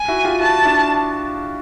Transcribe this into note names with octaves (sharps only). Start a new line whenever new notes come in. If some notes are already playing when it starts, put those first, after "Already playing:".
Already playing: G#5
E4 F#4
F4 G4
E4 F#4 A5
D4 E4